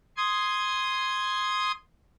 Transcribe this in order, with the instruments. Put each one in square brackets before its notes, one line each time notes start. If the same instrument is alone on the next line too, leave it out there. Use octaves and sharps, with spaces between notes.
[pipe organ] C6 D#6 G#6